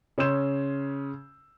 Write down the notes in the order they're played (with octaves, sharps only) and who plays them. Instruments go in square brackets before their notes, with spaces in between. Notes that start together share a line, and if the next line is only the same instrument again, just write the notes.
[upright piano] C#3 C#4 C6 E6 G6 E7